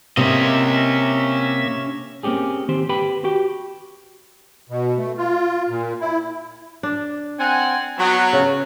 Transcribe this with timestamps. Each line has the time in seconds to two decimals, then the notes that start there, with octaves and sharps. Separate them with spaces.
0.17 C3 A#3 C#4 D#5 E5
2.23 A#3 C4 C#4 G4 G#4
2.68 D#3 C4 G4 C5
2.89 G4 B4 G5 B5
3.24 F#4 G4 G5
4.70 B2
4.98 A3
5.18 F4
5.69 A#2
6.01 E4
6.83 D4
7.39 C4 F#5 G#5
7.98 F#3 B3
8.33 C#3